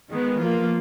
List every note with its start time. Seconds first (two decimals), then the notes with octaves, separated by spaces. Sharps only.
0.12 D#3 G#3 B3
0.42 F3 A#3 F4